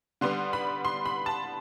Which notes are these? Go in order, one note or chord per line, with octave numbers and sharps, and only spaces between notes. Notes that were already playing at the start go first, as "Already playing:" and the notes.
D3 G3 B3 C6
B5
C6
B5
A5